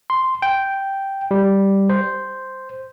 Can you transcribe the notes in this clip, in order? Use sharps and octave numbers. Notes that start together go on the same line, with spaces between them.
C6
G5
G3
C5